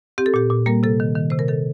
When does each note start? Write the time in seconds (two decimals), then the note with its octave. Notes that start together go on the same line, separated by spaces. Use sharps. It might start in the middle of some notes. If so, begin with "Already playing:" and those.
0.18 C4 G4
0.26 A4
0.34 A#2 G4
0.50 A#2
0.66 G3 A#3 A#4
0.83 C3 A4
1.00 D#3
1.16 D#3
1.30 C3 C5
1.39 A#4
1.48 D#3 A4